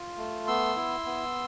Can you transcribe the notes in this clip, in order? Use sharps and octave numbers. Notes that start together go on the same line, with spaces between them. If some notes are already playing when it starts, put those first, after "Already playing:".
Already playing: F4
A3
B3 C6 E6
E4
B3